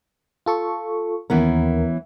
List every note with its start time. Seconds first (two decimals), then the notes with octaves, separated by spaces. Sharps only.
0.46 F4 A4 C#6
1.30 D#2 E3 B3 C#4 A#4